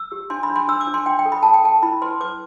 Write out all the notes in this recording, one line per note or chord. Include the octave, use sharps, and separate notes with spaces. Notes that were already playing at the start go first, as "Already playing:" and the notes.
Already playing: E6
G4
D4 C6
B5
D4
C6
D4 E6
D6
D4
C6
D4 G5
G5
A4
B5
A4 A5
G5
A4 A5
E4 B5
B4 C6
B4 D6